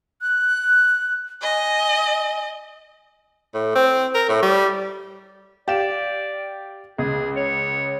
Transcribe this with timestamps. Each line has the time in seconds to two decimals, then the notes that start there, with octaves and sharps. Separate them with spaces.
0.21 F#6
1.42 D#5 G#5
3.54 A2
3.75 C4
4.15 A#4
4.29 A2
4.43 G3
5.68 G4 D5 F5 E7
6.98 C#2 G#4
7.36 C#5